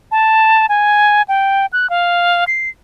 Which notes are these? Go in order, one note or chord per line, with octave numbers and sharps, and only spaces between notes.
A5
G#5
G5
F#6
F5
C7